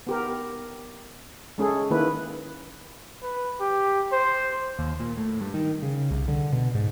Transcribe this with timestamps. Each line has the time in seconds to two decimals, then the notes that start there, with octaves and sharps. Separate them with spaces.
0.07 B3 G4 A#4
1.58 G#3 C#4 G#4 A4
1.90 D#3 A#3 E4 B4
3.22 B4
3.60 G4
4.12 C5
4.78 D#2
5.00 A#2
5.17 A2
5.41 G2
5.54 D#3
5.82 C#3
6.11 C2
6.28 D3
6.52 B2
6.75 G#2